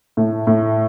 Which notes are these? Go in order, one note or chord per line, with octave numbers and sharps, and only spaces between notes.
A2
A2